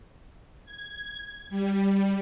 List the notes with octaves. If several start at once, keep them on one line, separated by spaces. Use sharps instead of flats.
G#6
G3